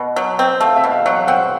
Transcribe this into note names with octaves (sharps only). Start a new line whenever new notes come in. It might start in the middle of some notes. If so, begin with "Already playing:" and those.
Already playing: B2
F#3
C4
A3 F5
E5
B2
F5
F#3 F#5
F5
C4 F#5